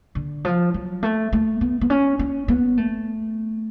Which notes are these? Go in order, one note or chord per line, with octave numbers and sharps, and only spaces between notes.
D3
F3
F#3
A3
A3
B3
B3
C#4
C#4
B3
A3